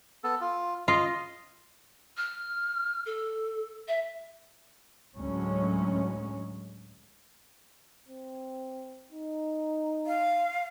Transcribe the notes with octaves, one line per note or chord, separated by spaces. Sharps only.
B3 A4
F4
F4 D#5
F6
A4
E5
D2 A2 F#3 G#3 C#4
C4
D#4
F5